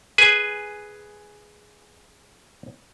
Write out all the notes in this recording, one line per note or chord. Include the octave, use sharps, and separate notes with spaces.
G#4 B4 G#5